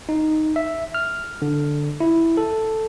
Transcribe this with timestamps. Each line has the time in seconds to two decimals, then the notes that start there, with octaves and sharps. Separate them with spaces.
0.09 D#4
0.56 E5
0.94 F6
1.42 D3
2.00 E4
2.37 A4